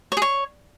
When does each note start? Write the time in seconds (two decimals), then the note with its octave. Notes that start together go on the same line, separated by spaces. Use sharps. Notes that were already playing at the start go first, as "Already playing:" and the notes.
0.12 C#5
0.17 G#4
0.22 C#5